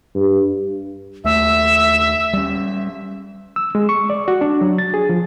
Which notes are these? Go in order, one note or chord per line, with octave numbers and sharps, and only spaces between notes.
G2
D#2 A3 E5
G3 C#4
E6
G#3
C#6
D5
F#4
D4
F#3
A6
G#4
F3